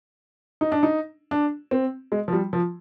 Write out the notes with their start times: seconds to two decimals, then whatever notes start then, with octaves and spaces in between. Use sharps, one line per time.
0.61 D#4
0.72 D4
0.83 D#4
1.31 D4
1.71 C4
2.12 G#3
2.28 F3
2.33 G3
2.53 F3